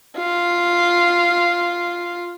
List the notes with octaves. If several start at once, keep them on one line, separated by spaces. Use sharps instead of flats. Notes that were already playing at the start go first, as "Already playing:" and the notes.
F4